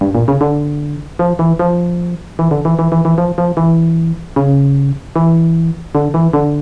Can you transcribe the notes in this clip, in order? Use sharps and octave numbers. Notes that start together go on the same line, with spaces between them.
G2
A#2
C#3
D3
F3
E3
F3
E3
D3
E3
E3
E3
E3
F3
F3
E3
C#3
E3
D3
E3
D3